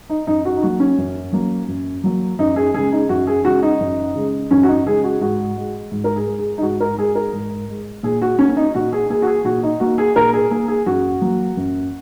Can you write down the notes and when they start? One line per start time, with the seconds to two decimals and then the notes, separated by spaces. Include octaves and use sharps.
0.10 D#4
0.27 F#2 D#4
0.45 F#4
0.57 D#4
0.62 F#3 A#3 F#4
0.80 C#4
0.98 F#2
1.32 F#3 A#3
1.68 F#2
2.04 F#3 A#3
2.39 F#2 D#4
2.56 G#4
2.74 C#3 G#3 G#4
2.92 D#4
3.09 F#2 F#4
3.27 G#4
3.45 C#3 G#3 F#4
3.63 D#4
3.80 F#2
4.15 C#3 G#3
4.51 F#2 C#4
4.63 F#4
4.68 D#4
4.86 C#3 G#3 G#4
5.04 F#4
5.21 G#2 F#4
5.57 G#3
5.91 G#2
6.04 A#4
6.16 G#4
6.27 G#3
6.39 G#4
6.58 D#4
6.62 G#2 F#4
6.80 A#4
6.98 G#3 G#4
7.15 A#4
7.33 G#2
7.69 G#3
8.03 A#2 G#4
8.22 F#4
8.39 A#3 C#4
8.49 C#4
8.57 D#4
8.75 A#2 F#4
8.93 G#4
9.10 A#3 G#4
9.22 F#4
9.27 G#4
9.44 A#2 F#4
9.63 D#4
9.80 A#3 F#4
9.98 G#4
10.16 A#2 A#4
10.33 G#4
10.51 A#3 G#4
10.68 G#4
10.86 F#2 F#4
11.21 F#3 A#3
11.57 F#2